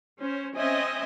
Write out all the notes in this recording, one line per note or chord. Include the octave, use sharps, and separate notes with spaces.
C#4 C5
C4 C#4 D#5 E5 G#5